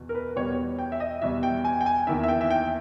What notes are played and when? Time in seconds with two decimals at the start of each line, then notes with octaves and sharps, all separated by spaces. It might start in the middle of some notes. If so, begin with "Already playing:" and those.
Already playing: E2 B2
0.09 A#4
0.15 B4
0.36 E2 B2 G3 C#5
0.79 G5
0.92 E5
1.00 D#5
1.22 E2 B2 G3 E5
1.43 G5
1.65 G#5
1.81 G5
1.86 G#5
2.07 E2 D#3 A#3 E4 E5
2.23 E5
2.28 G5
2.41 E5
2.50 G5